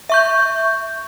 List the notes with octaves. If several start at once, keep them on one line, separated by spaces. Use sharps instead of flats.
E5 C#6 G6